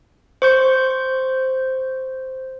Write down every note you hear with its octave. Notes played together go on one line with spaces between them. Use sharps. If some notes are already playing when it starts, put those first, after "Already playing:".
C5 C#6 G6